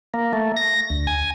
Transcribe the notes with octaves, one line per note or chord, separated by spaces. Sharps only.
A#3
A3
A#6
D2
G#5